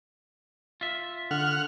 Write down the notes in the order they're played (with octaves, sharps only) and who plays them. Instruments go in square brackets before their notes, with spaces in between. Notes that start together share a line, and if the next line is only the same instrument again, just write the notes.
[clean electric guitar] F4 E5
[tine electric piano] D3 [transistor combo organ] F#5 F6